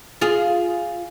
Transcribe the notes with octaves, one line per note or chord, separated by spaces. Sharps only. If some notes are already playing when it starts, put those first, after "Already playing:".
F4 G#4